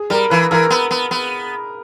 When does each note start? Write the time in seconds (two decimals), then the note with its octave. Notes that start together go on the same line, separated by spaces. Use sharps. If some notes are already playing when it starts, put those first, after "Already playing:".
Already playing: G#4
0.10 G3 A#4
0.30 E3 B4
0.51 E3 A#4
0.70 B3
0.91 B3
1.11 B3